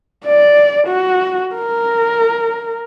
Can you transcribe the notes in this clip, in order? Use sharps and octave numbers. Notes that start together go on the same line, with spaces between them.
D5
F#4
A#4